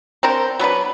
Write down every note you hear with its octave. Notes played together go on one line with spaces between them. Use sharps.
C4 D4 A#4 C5
F#3 B3 D4 B4